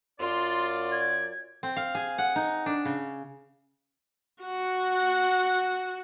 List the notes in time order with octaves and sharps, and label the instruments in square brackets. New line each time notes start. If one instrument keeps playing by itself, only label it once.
[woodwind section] F#2 D5 [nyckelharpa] F4 [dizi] C6
[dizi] G#6
[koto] C4
F5
G#4
F#5
D#4
D4
C#3
[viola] F#4 F#5